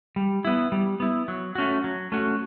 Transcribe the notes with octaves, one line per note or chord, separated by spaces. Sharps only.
G3
B3 E4
G3
B3 E4
F#3
A3 C#4 F#4
F#3
A3 C#4 F#4